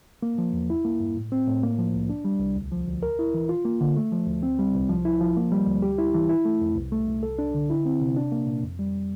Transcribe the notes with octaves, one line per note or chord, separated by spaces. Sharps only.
A#3
F3
E2
E4
A#3
G2
A2
C4
A2
A#3
F3
C2
D4
G3
C2
D2
F3
D2
A#4
E4
E3
F4
A#3
D3
A3
F3
D2
C4
G3
C2
F3
E4
F3
A#3
G3
D2
G4
E4
E3
E4
A3
F2
C2
A3
C2
A4
D4
D3
E4
C4
C3
D4
A#3
A#2
F2
G3